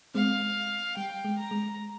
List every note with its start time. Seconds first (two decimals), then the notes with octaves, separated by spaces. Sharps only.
0.14 G#3 C4 F5
0.97 G3 G5
1.24 G#3
1.38 A#5
1.51 G#3